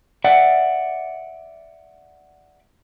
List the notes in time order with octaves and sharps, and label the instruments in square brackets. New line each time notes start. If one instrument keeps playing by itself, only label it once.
[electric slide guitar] D5 E5 F#5